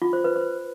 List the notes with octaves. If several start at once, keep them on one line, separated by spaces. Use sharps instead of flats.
F4
C5
B4
C5